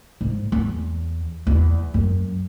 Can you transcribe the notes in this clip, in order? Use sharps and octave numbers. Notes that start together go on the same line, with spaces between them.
G#2
E2
E2
F#2